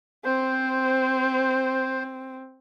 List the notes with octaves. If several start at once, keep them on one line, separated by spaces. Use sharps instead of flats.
C4 C5